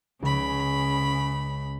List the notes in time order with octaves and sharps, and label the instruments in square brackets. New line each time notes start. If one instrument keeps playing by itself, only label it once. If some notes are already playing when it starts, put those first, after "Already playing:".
[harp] C#2 [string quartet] C#3 B5